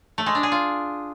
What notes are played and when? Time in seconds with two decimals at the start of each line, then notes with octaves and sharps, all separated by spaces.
0.18 A3
0.26 G#3
0.35 D4
0.43 G#4
0.52 F4